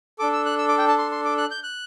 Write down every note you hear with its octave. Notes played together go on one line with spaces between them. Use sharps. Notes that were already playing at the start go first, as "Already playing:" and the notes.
D4 A4 D6
E6
F#6
E6
D6
G5
A5
C6
C6
D6
F#6
G6
F#6